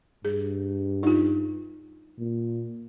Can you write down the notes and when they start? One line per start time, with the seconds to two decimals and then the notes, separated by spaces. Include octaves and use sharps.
0.25 G2 G#4
1.03 D#4 F4
2.18 A#2